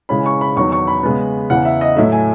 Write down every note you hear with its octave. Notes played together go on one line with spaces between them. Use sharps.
C#3 E3 G#3 C#4 B5
C#6
B5
E2 D#3 F#3 C#6
C#6
B5
C#3 G#3 B3
E2 C#3 E3 F#5
E5
D#5
A2 F#3 A3 E5
G#5